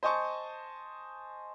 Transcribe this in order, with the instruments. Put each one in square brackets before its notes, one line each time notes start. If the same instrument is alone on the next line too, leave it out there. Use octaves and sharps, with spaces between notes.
[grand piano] C5 D#5 G#5 A5 C#6